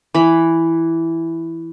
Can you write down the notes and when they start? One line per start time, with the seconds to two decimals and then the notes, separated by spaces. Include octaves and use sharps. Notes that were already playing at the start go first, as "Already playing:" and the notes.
0.14 E3 B5